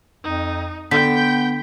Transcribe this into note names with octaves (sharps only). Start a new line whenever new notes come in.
F2 D#4
D3 B3 G5 G6 B6